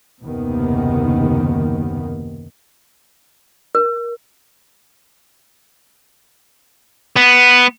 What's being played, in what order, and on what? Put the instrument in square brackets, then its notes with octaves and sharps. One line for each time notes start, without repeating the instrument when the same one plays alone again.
[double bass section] F#1 D#2 C3 D#3 B3
[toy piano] A#4
[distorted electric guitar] B3